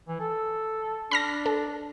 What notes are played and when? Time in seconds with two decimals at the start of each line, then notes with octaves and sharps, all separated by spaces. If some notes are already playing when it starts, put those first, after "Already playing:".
0.08 E3
0.20 A4
1.11 D4 B5 F6 A#6
1.46 A4